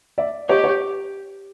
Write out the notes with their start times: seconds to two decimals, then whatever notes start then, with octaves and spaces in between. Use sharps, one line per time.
0.18 D5 E5
0.49 G4 C#5 D#5
0.64 C#5